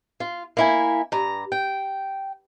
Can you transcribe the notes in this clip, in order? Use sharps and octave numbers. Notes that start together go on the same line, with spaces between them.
F4
A#3 E4 G#5
G2 A#5
G5